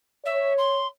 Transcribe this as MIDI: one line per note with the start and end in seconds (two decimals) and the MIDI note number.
0.25 0.80 73
0.25 0.53 76
0.57 0.87 84